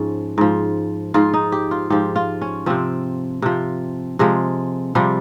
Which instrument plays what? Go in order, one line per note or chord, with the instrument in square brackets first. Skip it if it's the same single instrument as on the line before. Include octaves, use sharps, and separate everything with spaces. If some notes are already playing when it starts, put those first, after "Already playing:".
Already playing: [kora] G#2 F3 C#4
G#2 F3
G#2 F3 F4
D#4
G4
F4
G#2 F3 G4
F4
C#4
C3 F3 C4
C3 F3
C3 F3 G#3
C3 F3 G3